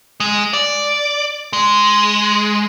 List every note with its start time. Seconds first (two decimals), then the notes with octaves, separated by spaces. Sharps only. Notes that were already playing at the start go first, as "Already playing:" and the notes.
0.20 G#3
0.53 D5
1.53 G#3